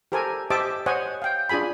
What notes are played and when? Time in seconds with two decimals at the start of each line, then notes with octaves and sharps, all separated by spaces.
0.12 G4 A4 A#4 C5 G#5
0.50 G4 C5 D#5 E5 A5 D6
0.86 C5 C#5 D#5 F#5 G#5
1.22 F5 G5
1.49 D4 F4 G#4 G#5 B5